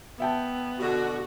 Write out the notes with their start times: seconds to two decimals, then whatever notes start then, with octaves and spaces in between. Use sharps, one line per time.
0.20 B3 E5 G5 A5
0.79 B2 D3 F#4